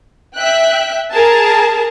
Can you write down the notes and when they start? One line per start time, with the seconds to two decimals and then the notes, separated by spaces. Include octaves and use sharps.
0.36 E5 G5 F#6
1.12 G#4 A#4 A5